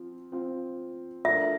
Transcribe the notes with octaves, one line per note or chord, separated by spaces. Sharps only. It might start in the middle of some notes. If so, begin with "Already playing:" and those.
Already playing: F3 C4 F4
F3 C4 F4
F3 A3 D4 F4 A#4 E5